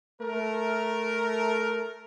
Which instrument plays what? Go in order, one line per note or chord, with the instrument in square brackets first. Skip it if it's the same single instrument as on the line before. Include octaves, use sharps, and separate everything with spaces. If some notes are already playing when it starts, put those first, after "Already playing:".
[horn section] A3 A#4